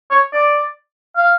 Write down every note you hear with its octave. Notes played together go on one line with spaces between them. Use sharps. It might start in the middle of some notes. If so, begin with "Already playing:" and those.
C#5
D5
F5